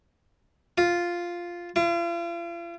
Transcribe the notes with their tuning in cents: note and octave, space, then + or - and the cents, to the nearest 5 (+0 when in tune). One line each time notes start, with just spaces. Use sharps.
F4 +0
F4 -40